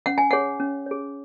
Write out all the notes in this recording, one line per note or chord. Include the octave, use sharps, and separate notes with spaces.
C#4 F#5
G#5
G#4 C#5 F#5
C#4
G#4 C#5